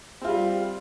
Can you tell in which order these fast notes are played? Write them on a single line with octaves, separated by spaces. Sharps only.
C4 F4 G3